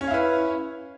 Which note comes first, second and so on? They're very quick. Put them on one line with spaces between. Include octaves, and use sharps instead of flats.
C#4 C#5 F5 E4 B4